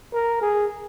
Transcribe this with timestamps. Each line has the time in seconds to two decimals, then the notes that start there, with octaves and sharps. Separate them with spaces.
0.13 A#4
0.42 G#4